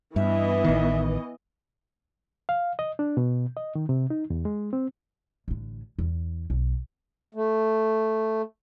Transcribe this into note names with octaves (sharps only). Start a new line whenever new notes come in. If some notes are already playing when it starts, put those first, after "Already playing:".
G2 E3 B3 D#5 E5
A1 D#3
F5
D#5
D4
B2
D#5
D#3
C3
D#4
E2
G#3
C4
A1 D3
E2
B1
A3